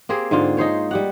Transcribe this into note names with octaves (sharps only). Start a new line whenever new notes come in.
A#3 C4 G4 G#4
G#2 D3 F4
D#4 G#4 C5 C#5
G3 G4 F#5